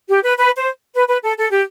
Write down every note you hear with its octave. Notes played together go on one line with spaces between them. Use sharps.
G4
B4
B4
C5
B4
B4
A4
A4
G4